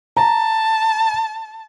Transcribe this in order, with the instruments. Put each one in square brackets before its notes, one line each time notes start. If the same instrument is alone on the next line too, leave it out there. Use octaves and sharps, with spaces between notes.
[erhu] A5 [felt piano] A#5